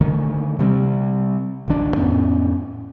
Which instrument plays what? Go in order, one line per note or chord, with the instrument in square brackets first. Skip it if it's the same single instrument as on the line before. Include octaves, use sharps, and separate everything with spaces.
[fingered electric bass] D3 D#3 A3
C3 G3 B3 C4
A1 D2 D#3 D4
F2 A2 B3 C#4